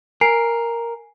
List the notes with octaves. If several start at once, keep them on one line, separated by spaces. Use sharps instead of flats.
A#4 G#5 C7 D7